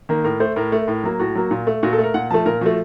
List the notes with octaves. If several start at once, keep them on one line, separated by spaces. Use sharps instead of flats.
D#3 A#3
A2 A#4
A3 C5
A2 A#4
A3
A2
F#3 A#3
A2 F#4
F#3 A#3
A#2
A3
A#2 F#4
A4
A3
A#4
A#2 F#5
F3 A3 A5
A#2 A#4
F3 A3 F#4